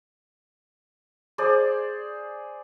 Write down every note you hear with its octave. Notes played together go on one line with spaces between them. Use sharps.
G#4 C5 D5